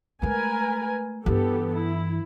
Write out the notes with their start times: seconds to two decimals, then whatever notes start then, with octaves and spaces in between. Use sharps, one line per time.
0.22 G#3 A3 A#4 B4 G#5
1.26 G2 E3 B3 G4 A4
1.77 E4